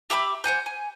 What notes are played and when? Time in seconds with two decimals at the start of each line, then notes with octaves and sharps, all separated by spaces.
0.10 G4 E5 B5 D6
0.44 C5 F#5 G#5 G6
0.66 G#5